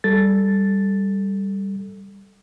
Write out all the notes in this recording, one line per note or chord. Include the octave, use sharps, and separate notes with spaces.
G3 A4 A6